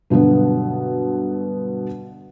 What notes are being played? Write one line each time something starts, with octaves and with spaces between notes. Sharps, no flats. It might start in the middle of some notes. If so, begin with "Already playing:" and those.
G2 B2 D3 F#3 B3